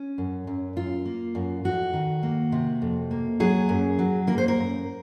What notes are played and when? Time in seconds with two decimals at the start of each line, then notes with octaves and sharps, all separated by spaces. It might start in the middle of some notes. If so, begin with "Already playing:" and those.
Already playing: C#4
0.18 F#2
0.47 F#2
0.76 F#2 F4
1.05 A#3
1.35 F#2
1.64 F2 F#4
1.93 D#3
2.23 A#3
2.52 C3
2.82 F2
3.11 A#3
3.40 F#3 G#4
3.69 F#2
3.99 F#3
4.27 A#3 A#4
4.38 C5
4.48 A#4
4.57 F#2